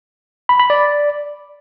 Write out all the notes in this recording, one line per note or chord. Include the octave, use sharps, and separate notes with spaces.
B5
B5
D5